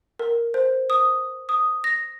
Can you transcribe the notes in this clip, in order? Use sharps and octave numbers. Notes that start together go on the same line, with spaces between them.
A#4
C5
D#6
D#6
A#6